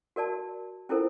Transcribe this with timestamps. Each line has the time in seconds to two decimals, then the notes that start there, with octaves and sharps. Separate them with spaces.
0.16 F#4 A#4 D5 A5
0.89 C#4 E4 F4 A4 A#4 C5